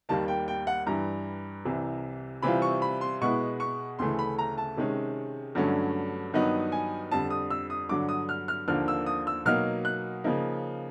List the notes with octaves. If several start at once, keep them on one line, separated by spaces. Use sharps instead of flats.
D#2 D#3 G3 A#3 A5
G5
G5
F#5
G2 E3 G3 A#5
C2 C3 E3
C3 E3 G3 C4 F4 B5
C#6
B5
C6
B2 G#3 B3 E4 C#6
C#6
D2 C#3 E3 A3 C6
B5
A#5
A5
C3 D#3 G#3 C#4
G2 D3 F#3 A3 C#4
G2 D#3 F#3 B3 D#4
G#5
F2 D3 G3 A5
D#6
E6
D#6
G2 D3 F#3 D6
D#6
F6
F6
D#2 D3 F3 A#3 D4 F6
E6
D#6
E6
B2 F#3 A#3 D#4 F6
F#6
C#3 F3 A#3 D#4